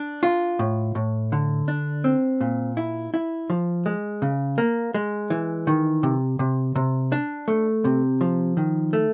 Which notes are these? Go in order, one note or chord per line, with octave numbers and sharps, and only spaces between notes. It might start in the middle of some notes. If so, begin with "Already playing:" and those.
Already playing: D4
F4
A2
A2
D3
D4
C4
A#2
E4
E4
F3
G#3
C#3
A#3
G#3
E3
D#3
C3
C3
C3
D4
A3
C3
F3
D#3
A3